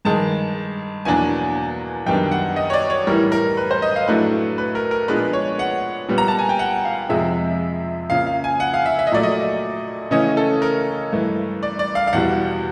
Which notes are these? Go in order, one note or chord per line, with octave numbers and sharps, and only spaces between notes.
G2 D#3 G#3 A5
E2 B2 F#3 A#3 D4 G#5
F#2 D#3 G3 B3 D4 G5
F#5
D#5
C#5
D5
C#5
A2 E3 G3 A#4
A#4
B4
C5
D#5
F5
A2 F#3 A3 D4 B4
B4
A#4
A#4
A#2 F3 G#3 B3 D4 B4
C#5
F#5
A#2 G3 B3
A#5
A5
G#5
G5
F#5
F5
F2 C3 F3 G#3 E5
C#3 F3 A#3 F5
F5
G#5
F#5
F5
E5
E5
D#5
A#2 F#3 A3 D5
D#5
C#3 E3 A3 C#4 D#5
A4
A#4
G2 E3 A3
D5
D5
F5
F5
E2 B2 G3 F#5